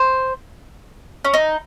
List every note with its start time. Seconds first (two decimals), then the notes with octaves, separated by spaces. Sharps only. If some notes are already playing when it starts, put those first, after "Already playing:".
Already playing: C5
1.25 C#4
1.34 D#4